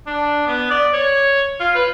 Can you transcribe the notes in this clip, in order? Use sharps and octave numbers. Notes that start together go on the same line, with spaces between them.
D4
B3
D5
C#5
F4
B4